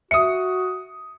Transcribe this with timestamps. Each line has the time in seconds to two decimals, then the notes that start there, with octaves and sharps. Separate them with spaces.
0.11 F#4 E5 D#6 C#7